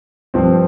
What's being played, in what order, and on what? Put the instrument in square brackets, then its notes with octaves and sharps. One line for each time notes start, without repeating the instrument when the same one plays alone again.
[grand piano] G2 F3 C4